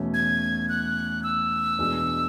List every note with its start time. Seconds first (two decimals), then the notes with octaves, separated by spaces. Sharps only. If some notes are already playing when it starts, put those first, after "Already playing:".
Already playing: E2 B2 A3 C#4
0.14 G#6
0.69 F#6
1.23 E6
1.78 E2 B2 G#3 D4